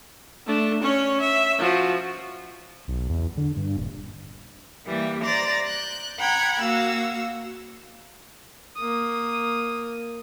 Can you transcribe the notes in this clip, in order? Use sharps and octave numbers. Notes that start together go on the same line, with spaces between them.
A3 D4
C#4 C#5
E5
F3 F#4
B1
E2
D3
G2
D#1
E3 G3 A#3
C5 D5 A#5 D6 A6
F#6 G6
F#5 G5 A#5 B5 G#6
A#3 F#4 F5 E6
A#3 D#6